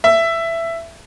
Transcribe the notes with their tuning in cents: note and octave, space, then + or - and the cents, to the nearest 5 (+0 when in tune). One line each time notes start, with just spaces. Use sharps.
E5 +15